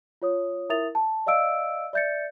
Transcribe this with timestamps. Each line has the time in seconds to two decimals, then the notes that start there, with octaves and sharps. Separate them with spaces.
0.22 F4 C#5 D#6
0.70 E4 A#4 E5 D#6 A6 F7
0.95 A5
1.26 D5 D#5 F5 E6 D7
1.93 D5 E5 G6 A6 C#7